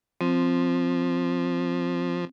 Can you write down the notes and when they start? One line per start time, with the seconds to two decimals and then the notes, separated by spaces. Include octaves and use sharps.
0.21 F3 C4